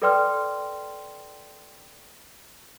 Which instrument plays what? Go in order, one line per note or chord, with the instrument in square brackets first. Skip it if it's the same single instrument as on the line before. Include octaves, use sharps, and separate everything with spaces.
[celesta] A4 B4 D5 G5 C6 F6